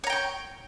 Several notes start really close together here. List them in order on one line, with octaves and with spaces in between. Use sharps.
C#5 A#5 G5 C#6